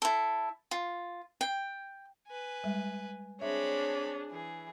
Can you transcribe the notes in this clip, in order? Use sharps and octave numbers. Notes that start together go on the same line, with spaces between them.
E4 A4
F4
G5
B4 G#5
G3 G#3
C4 D4 G#4 C#5 E5 B5
E3 G#4